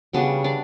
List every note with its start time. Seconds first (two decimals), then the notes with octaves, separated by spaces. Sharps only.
0.13 C#3 G3 B3 D4 F#4
0.44 D4